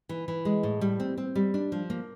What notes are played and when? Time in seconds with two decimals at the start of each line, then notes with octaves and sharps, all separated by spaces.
0.09 E3
0.28 E3
0.45 G#3
0.63 A2
0.81 G3
1.00 C4
1.18 C4
1.35 G3
1.54 D4
1.72 F3
1.90 A#3